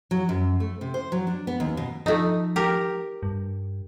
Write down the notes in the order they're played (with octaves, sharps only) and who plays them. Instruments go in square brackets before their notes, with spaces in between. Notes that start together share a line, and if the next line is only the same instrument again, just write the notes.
[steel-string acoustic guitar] F#3
F#2
A3
C3
C5
F#3
D4
B3
D#2
B2
[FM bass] F3 [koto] A3 D#4
[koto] G4 A#4
[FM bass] G2